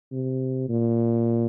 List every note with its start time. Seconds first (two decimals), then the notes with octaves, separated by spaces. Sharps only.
0.12 C3
0.69 A#2